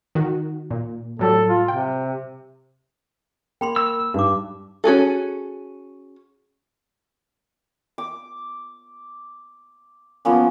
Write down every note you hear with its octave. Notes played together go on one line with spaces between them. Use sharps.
D#3 F#4
A#2
A2 F#3 G3 A4
F4
C3 G5
A#3 G5 B5 C6
B5 E6
G2 D#4 D6
C#4 F#4 G#4 A4
D6
F3 A#3 B3 C#4